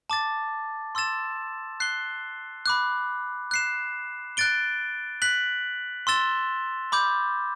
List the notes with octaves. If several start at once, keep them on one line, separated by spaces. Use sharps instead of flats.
A5 D6 A6
C6 E6 A6 E7
F#6 C7 G7
B5 D6 F#6
F#6 C7 E7
F#6 A6 D7 G7
F#6 B6 F#7
C6 E6 A6 E7 G7
B5 D6 G6